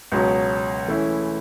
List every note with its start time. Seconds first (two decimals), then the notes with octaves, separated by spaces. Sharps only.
0.12 C#2 B2 F#3 C#4
0.88 E3 A3 C#4 E4